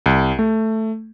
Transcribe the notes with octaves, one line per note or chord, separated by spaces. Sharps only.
C2
A3